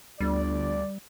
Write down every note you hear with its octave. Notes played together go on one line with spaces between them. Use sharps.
G1 D2 G3 D5